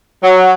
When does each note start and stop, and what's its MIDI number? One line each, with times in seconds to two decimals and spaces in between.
0.23 0.52 54